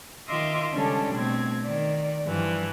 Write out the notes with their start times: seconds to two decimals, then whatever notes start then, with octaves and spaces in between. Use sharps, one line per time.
0.29 D#3 F4 D#5 E5 C6 D6
0.73 C#3 G3 G#3 C#4 D4 A4
1.12 B2 A3 C4 G#6
1.63 D#3 D5
2.26 G2 E3 F3